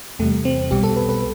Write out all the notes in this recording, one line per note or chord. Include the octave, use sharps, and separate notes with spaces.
E2 C3 G3 A3
C4
B1 B2 G3 G4
A4
B4
B4